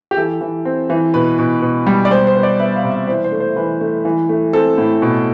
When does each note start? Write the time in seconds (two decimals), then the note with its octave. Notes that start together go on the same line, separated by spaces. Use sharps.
0.11 G4
0.17 E3 A4
0.41 E3
0.65 C4
0.90 E3
1.14 B2 B4
1.39 B2
1.62 B2
1.87 G3
2.05 D5
2.11 G3 C5
2.27 C5
2.36 B3
2.43 D5
2.59 B3 E5
2.76 F5
2.84 C3
2.92 E5
3.08 E3 C5
3.24 C5
3.32 A3
3.40 C5
3.56 E3 B4
3.81 A3
4.05 E3
4.29 A3
4.53 C4 A4
4.78 A2
5.02 B2